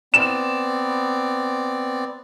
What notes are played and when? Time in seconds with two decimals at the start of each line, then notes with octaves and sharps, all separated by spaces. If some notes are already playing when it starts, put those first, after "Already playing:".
0.14 B3 C4 D5 E7